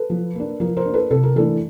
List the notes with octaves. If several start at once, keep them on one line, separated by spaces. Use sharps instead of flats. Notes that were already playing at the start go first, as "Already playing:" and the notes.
Already playing: A4 B4
F3
A#3 D4
F3 A#4
A#4 C5
A#3 D4
A4 B4
C3 A4
A#4
E3 A3 D4 A4